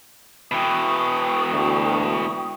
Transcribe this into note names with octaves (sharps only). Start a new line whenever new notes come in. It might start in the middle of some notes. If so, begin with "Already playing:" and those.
B2 E3 G5 C#6 D#6
D2